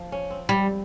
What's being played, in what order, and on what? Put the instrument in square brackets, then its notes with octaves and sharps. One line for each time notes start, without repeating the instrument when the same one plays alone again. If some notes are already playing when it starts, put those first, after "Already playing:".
Already playing: [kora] F3
C#4
C4
[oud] G3